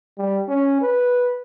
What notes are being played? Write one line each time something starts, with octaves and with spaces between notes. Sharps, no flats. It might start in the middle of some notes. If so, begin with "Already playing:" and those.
G3
C#4
B4